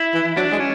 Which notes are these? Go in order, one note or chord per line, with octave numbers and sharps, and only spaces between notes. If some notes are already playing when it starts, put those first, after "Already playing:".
Already playing: E4
E3
F#3 D4
G#3
C#4